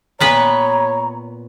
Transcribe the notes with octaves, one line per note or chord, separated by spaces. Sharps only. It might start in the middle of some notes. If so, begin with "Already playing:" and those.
A#2 B3 B4 C#5 A#5